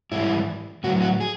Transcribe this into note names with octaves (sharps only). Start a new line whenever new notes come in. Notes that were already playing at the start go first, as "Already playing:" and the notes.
G#2 E3 G3 E4
A2 F#3 F#4
F#4
G#4